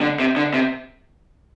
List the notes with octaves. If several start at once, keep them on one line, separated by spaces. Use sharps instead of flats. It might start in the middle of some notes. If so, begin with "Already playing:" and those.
D3
C3
D3
C3